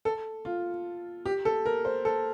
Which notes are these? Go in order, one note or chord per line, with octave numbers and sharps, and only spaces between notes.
A4
F4
G4
A4
A#4
C5
A4